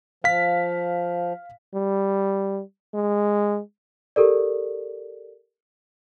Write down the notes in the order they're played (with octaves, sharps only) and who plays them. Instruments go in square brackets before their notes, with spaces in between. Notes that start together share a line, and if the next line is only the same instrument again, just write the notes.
[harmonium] F3 [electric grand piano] F5 B6
[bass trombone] G3
G#3
[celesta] G4 A4 A#4 D5